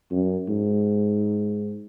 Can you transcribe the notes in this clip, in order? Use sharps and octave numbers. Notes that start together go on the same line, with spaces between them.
F#2
G#2